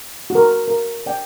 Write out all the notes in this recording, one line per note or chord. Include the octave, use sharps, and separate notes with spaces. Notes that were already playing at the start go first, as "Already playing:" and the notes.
F#4
A#4
A#4
D5 G5